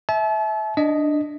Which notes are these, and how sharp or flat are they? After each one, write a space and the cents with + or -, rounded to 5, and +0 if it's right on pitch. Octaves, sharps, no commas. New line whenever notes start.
E5 -15 A5 -40
D4 +10 D#5 +0